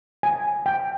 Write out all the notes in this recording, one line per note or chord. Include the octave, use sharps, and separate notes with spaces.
G#5
G5